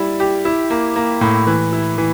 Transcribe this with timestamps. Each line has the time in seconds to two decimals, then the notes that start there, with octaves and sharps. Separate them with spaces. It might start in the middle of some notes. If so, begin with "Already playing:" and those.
Already playing: G3 E4
0.20 G4
0.45 E4
0.70 A#3
0.96 A#3
1.21 A2
1.47 E3
1.72 E4
1.98 E3